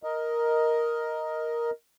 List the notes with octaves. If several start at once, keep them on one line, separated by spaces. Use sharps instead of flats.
A#4 D#5